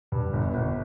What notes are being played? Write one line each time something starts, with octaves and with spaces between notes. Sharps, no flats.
G2
G1
G1